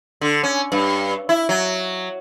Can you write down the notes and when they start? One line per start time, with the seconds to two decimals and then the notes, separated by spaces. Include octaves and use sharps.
0.21 D3
0.43 C#4
0.72 G2
1.29 E4
1.49 F#3